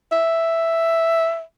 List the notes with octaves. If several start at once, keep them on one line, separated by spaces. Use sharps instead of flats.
E5